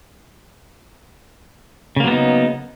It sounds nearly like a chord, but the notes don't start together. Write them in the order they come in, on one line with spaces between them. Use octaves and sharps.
C#3 A#3 F#3 B3 D#4